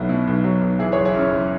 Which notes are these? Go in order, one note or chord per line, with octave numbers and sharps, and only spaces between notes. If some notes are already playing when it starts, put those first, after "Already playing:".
Already playing: B1 F#3 B3 E4
B2
B1
F#3
B1
E3 E4 G#4
G#4 C#5
F#1
E4 G#4
F#2 C#4
F#1